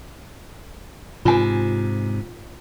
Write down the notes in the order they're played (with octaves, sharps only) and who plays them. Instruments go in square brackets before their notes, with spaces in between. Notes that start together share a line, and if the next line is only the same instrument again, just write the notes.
[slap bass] G#2 C3 [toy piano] F4 G#5